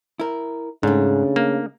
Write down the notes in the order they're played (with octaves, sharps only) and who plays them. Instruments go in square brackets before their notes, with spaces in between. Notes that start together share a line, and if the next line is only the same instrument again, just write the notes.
[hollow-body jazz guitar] E4 A#4
[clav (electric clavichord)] G#2 [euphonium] C#3 [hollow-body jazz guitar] A3 D4
[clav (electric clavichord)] A#3